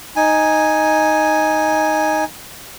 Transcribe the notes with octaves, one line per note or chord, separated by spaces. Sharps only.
D#4 G#5